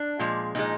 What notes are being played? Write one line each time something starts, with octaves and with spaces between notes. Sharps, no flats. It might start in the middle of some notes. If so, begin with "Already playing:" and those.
Already playing: D4
A#2 F3 G#3
A#2 F3 G#3 D#4